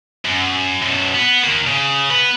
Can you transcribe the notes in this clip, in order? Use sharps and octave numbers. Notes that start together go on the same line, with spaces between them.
F#2
F#2 B2
B3
D#3 A#3
C#3
B3 B4